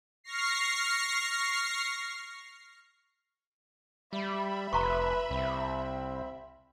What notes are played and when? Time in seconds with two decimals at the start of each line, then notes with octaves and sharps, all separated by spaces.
0.24 C#6 F6 A#6 C7
4.13 G3 E5 B5
4.73 F1 B4 A#5 C6 C#6
5.31 C2 C4